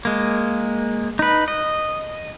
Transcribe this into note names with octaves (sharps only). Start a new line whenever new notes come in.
G#3 A#3
D#4 B4
D#5